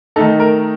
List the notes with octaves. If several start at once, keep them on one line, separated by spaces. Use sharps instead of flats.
D#3 A3 D#4 A4
A#4